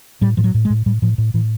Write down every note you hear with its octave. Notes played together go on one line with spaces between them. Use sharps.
A2 G3
A2 F3
F#3
A2
G#3
A2
A2 G3
A2 F3
A2
A2 E3